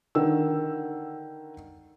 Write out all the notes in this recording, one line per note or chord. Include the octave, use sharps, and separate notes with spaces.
D3 D#3 E6